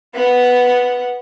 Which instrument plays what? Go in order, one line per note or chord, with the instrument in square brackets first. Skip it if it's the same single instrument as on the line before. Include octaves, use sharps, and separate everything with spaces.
[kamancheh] B3 F#5